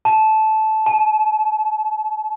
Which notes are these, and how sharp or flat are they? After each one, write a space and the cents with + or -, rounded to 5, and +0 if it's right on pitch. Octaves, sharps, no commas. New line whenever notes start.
A5 -15
A5 -45